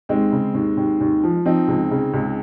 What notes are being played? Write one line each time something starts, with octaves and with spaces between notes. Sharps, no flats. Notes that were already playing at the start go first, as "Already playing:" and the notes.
D#2 G#3 C4
C#3
D#2
D#2
D#2
F3
F3 C4 D#4
C#2
C#3
C#2